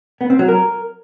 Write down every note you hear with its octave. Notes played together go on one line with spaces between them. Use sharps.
B3
C4
F#3
A#4